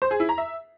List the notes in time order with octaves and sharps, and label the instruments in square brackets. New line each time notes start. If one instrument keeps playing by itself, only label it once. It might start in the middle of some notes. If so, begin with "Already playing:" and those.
[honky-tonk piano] C5
G#4
E4
A#5
E5